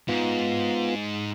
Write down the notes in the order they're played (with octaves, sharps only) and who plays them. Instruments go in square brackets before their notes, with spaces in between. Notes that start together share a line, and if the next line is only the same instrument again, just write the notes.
[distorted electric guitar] G#2 [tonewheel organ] B3 F4